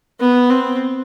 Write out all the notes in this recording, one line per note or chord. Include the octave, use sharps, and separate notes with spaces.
B3
C4